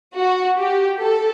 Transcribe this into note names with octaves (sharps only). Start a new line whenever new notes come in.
F#4
G4
A4